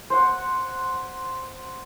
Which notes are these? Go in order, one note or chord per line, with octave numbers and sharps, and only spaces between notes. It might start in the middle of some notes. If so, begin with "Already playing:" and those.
C5 F#5